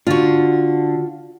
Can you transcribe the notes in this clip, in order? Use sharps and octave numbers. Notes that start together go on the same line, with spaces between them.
D3 D4 F4 F#4